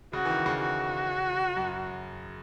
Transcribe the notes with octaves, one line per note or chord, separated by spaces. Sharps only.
C#3 F#4
E3
D#3
C#3
F#4
F#2